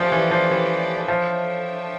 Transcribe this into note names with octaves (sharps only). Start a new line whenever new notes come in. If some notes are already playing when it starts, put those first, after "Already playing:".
Already playing: F3 A3 C#4 G4 D5 G5
E3
F3
E3
F3 D4 A4 C#5 E5 G5